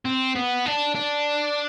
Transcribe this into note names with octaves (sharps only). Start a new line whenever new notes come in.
C4
B3
D4
D4